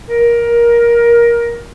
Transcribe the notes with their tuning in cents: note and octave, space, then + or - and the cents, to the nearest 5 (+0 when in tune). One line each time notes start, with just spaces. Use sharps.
A#4 +15